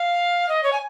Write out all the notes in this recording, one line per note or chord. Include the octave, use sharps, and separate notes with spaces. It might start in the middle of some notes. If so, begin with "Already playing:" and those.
Already playing: F5
D#5
C#5
G#5